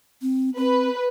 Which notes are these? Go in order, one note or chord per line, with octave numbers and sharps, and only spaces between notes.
C4
C4 B4